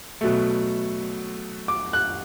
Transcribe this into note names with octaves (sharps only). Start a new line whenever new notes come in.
B2 F#3 A3
D6
F#6